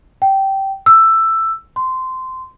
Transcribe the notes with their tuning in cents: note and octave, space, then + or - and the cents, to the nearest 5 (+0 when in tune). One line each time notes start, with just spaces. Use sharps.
G5 -15
E6 +10
C6 -15